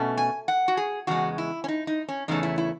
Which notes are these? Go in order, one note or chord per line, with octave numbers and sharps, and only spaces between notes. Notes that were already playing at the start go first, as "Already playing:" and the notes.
Already playing: B2 A3 C#4
G#5
F#5
F#4
G#4
E2 C#3 G#3 F#4
E4
C#4
D#4
D#4
C#4
E2 C#3 A3 C#4 D#4
E4
E4